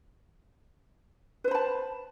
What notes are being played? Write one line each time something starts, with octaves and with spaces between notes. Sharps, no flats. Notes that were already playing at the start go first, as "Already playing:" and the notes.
B4 C5 A5 B5